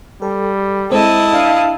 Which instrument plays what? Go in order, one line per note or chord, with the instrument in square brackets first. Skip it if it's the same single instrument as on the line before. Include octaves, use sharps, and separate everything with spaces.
[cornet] G3 [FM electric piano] A4
[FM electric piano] G#3 C4 A4 [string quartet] E4 D#5 A5
[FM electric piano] D4 [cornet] F5